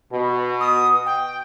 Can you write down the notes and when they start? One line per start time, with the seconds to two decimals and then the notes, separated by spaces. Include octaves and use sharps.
0.11 B2
0.60 D#6
1.06 G5